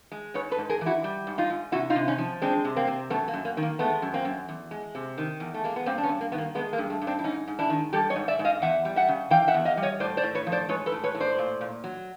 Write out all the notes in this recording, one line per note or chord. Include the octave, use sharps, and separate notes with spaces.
G#3
G#2 B4 C#5
A4 B4
G#2
G#4 A#4
E3
E4 F#4
G3
G#2
D#4 F4
G#2
C3 E4 F#4
D#4 F4
C3
C#4 D#4
F3
G#3 C4 D4
C3
A#3 C4
C3
F#2 A3 B3
A#3
F#2
A#3
D#3
A#3
G#3 A3 B3
F#2
A#3 C4
F#2
E2
G#3
C3
D#3
E2
A3
G#3 A#3
B3
G2 A#3 C4
D4
B3 C#4
G2
A#3
D#3 B3
A#3
G#3 A3 B3
A#3
G2
A3
G2
C4 D4
E4
G#2 C#4 D#4
G#2
D4 E4
D#3
G3 G4 A4
C#5 D#5
G#2
D5 E5
G#2
D#5 F5
E2 E5 F#5
G3
E5 F#5
C#3
E3 F5 G5
E5 F#5
E2
D#5 F5
G3
C#5 D#5
A2 C5 D5
C5 D5
A2
B4 C#5
F3
C5 D5
G#3 B4 C#5
A4 B4
A2
B4 C#5
A2
C5 D5
A#2
A#2
F#3